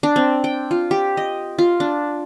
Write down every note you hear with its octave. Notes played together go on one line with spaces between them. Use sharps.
D4
C4
G5
F4
G4
D#5
F4
D4